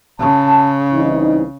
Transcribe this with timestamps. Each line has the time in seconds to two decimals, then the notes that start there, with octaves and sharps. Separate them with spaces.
0.20 C#3 A5
0.93 C2 E3 D#4